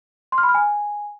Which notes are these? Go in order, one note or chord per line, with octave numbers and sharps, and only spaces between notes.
C6
F6
B5
F6
G#5